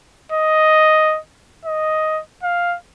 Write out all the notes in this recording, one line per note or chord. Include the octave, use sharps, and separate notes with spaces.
D#5
D#5
F5